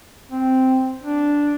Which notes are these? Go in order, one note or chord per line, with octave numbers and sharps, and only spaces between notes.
C4
D4